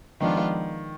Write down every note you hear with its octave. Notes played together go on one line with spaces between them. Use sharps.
D#3 F3 G#3 B3 D4 F4